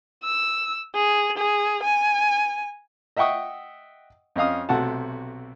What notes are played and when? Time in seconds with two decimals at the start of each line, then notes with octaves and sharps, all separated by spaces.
0.24 E6
0.95 G#4
1.38 G#4
1.84 G#5
3.17 D#5 E5 F#5 G5 C#6 D#6
4.36 F2 C#4 D#5 F5 D#6
4.69 B1 C3 A3 F#4 F#5 A5